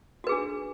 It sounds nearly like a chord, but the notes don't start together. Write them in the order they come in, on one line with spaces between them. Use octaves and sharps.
F#4 B4 G#4 D4